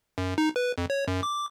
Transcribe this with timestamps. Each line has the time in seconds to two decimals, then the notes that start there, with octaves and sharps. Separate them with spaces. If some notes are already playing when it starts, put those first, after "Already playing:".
0.18 F#2
0.38 D#4
0.56 B4
0.78 F2
0.90 C#5
1.08 F#2
1.23 D6